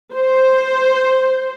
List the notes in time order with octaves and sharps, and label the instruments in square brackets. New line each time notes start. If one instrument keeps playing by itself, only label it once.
[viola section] C5